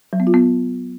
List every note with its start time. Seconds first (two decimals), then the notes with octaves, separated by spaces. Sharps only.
0.13 F#3
0.20 B3
0.27 F4
0.34 B3